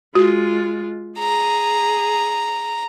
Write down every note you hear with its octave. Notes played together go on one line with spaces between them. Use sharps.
G#3 F4 F#4
G#4 A#5